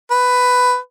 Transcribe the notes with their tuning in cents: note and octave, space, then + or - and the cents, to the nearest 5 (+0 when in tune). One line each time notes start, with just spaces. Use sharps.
B4 +10